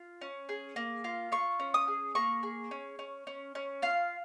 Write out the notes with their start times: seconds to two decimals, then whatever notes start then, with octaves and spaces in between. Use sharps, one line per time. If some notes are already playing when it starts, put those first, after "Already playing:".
Already playing: F4
0.21 C#4
0.49 G#4
0.76 A#3
1.04 F4
1.32 F4 C#6
1.60 C#4
1.74 D#6
1.88 G#4
2.15 A#3 C#6
2.43 G#4
2.71 C#4
2.99 C#4
3.27 C#4
3.55 C#4
3.82 F4 F5